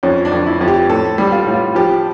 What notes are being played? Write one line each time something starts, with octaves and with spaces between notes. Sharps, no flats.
F2 C#4
D4
F2
E4
F2
G4
A2 A4
G3
F4
A2
F4
F3 G4